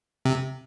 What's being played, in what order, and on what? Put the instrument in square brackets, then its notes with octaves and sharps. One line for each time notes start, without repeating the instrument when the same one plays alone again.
[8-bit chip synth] C3